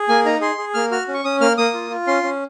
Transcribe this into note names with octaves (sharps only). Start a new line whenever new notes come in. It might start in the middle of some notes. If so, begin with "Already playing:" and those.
Already playing: G#4
A#3 G#5
D#4 A#5
G#4 C6
G#4
A#3 F6
F#4 F6
C#4
C#6
C#4 D#6
A#3 F6
A#3 D#6
F4
F4
C#4 C6
C#4